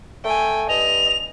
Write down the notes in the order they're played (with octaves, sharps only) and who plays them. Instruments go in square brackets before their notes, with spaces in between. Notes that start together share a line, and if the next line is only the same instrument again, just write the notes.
[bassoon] A3 [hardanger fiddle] G5 G#5
[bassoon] G2 [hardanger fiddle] D#5 [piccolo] F7